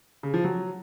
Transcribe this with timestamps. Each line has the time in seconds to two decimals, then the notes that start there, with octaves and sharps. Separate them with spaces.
0.23 C#3
0.34 F3
0.44 F#3